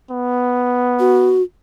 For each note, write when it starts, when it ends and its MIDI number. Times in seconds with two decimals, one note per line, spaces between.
0.10 1.43 59
0.99 1.42 66